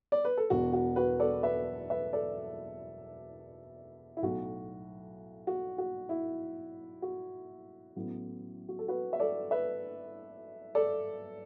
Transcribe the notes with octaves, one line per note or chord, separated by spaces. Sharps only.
D5
B4
A4
E1 E2 B2 F#4
F#4
F#4 B4
A4 D5
B4 E5
B4 E5
A4 D5
E4
B1 A2 F#3 F#4
F#4
F#4
E4
F#4
A1 A2 F#3 B3
F#4
A4
F#4 B4
E5
A4 D5
B4 E5
A4 D5